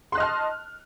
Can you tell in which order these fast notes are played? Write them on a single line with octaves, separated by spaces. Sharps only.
C6 F#6 D#5 F6 A5